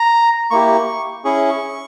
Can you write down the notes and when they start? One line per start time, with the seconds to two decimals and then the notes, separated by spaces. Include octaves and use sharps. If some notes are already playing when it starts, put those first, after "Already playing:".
Already playing: A#5
0.51 A#3 E4 G4 C#6
1.25 C#4 E4 G#4 C#6